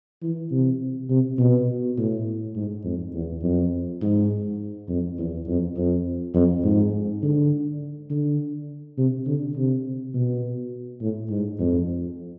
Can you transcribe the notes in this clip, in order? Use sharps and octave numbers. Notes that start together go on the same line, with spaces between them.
E3
C3
C3
B2
A2
G#2
F2
E2
F2
G#2
F2
E2
F2
F2
F2
G#2
D3
D3
C3
D3
C3
B2
A2
G#2
F2